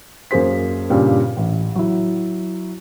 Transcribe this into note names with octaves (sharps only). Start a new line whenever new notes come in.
F#2 A#3 G#4 C5 B6
G2 A#2 C#3 G3
A1
F#3 E4